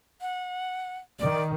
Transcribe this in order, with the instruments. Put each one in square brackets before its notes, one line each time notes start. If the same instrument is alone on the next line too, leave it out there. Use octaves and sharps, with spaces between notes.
[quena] F#5
[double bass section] D#3 [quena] D5